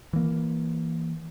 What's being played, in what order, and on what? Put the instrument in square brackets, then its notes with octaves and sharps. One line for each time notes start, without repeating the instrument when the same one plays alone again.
[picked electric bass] E3 A#3